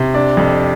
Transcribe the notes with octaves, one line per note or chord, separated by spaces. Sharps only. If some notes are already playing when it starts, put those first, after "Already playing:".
Already playing: C3
D4
F2